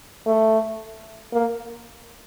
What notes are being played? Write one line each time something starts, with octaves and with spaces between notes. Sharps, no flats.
A3
A#3